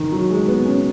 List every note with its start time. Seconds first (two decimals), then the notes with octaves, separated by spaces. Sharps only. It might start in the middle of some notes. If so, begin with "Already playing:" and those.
Already playing: D#3
0.12 F#3
0.30 G#3
0.48 B3
0.66 C#4